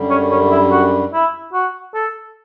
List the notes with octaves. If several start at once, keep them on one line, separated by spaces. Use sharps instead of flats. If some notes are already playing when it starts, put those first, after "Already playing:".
Already playing: F#2 D3 G3
C#4
C#4
E4
F#4
E4
F#4
A4